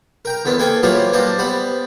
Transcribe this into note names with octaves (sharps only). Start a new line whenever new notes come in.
A#4 G5 A#5
E2 D3 B3 C4
A#3 G#4 A4 G5 G#5
A#2 E3 F#3 F4 G4 C5
G3 A#3 D4 C5 D5 D#5
G3 B3 C5 B5